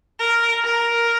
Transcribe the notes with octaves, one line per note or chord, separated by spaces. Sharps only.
A#4
A#4